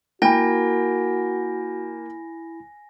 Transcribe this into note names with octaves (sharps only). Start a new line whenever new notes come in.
A#3 E4 F#4 A#4 G5 G#5 B5 A#6